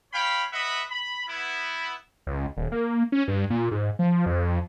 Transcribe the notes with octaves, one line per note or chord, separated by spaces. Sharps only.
C#5 F5 G5 B5
B4 D#5 E5 F#5 B5
B5
B3 E4
C#2
D#1
A#3
C#4
G2
A#2
G#2
F3
F2